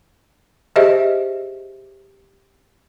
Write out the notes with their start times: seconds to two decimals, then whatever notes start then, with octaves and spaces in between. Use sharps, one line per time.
0.76 G4 G#4 C5 D#5 E5